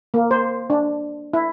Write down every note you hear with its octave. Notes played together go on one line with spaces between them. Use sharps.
A#3
C5
D4
E4